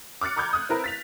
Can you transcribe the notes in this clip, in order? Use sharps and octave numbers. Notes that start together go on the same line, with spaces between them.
D6 F6 F#6 A6 C#7
A#5 B5 D6 F6 G6 G#6
D#6 F#6
C4 E4 A#4 B4
A6 B6 F7